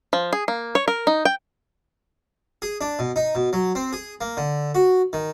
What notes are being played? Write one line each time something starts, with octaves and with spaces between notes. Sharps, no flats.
F3
G#4
A#3
C#5
A#4
D#4
G5
G#4
D4
B2
D#4
B2
F#3
C4
G#4
A#3
D3
F#4
D#3